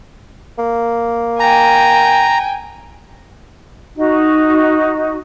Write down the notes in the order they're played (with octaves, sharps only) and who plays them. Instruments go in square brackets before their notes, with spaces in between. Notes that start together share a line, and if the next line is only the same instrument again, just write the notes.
[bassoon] A#3
[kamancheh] G5 G#5 [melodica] A#5
[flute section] D#4 F#4